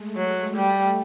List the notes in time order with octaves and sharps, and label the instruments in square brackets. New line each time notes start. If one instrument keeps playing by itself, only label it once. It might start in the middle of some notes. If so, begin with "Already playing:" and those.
Already playing: [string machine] G#3 A3
[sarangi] F#3
[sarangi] G3 [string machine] A3